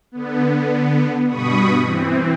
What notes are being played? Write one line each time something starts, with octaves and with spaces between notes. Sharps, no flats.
D3 B3
G2 B2 B5 C#6 D#6
E3 C4